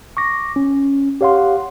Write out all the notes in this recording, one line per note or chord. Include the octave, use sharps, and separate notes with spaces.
C#6 D6 A#6
C#4
G4 C#5 F5 F#5 C6